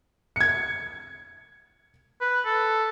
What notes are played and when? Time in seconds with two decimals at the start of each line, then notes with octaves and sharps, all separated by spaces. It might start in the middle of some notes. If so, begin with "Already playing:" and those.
0.36 G#6 C#7
2.20 B4
2.45 A4